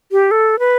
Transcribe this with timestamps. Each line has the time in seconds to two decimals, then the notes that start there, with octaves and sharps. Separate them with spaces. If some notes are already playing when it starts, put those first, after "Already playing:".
0.12 G4
0.31 A4
0.59 B4